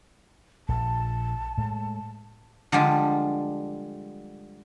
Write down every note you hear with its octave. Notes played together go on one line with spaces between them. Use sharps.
A#1 A5
A2 G#3
D3 F3 G3 G#3 F4